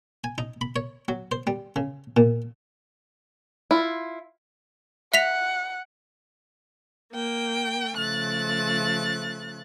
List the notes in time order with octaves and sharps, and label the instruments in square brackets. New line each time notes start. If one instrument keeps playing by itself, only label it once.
[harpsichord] G#5
D#4
B5
C#5
F#3
C5
G3
C#3
A#2
[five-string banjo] E4 F4
[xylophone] E5 B6 F7 [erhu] F#5
[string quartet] A#3 G5
C#3 F3 A3 F#6 A6